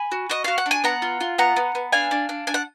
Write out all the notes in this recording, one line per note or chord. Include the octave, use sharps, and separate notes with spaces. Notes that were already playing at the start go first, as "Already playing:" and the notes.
Already playing: G#5 B5
F#4
F#4 D#5
F#4 F5
F#5
D4
G#5
B3 F#5 A#5
F4
F4
B3 F#5 A#5
B3
B3
D4 F5 G#5
D4
D4
D4 G#5
F#5